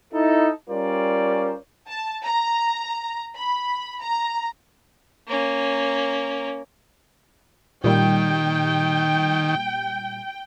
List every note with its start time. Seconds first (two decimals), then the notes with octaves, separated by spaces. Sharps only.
0.14 D#4 E4 A4
0.69 G3 C#4 F4 A#4 C5 D5
1.88 A5
2.24 A#5
3.36 B5
4.01 A#5
5.28 A#3 C#4
7.84 A#2 D#3 G3 G5